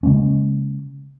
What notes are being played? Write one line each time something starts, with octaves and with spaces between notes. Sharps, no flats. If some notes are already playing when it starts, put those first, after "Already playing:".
C#3 G#3 A#3 C#4